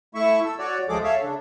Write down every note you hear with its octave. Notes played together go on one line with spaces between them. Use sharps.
A3 E4 E5 C#6
A4 E6
F#4 C#5 D5
D2 F3 G#3 G#4 A4 D6
A4 C#5 E5 F5
C#3 D4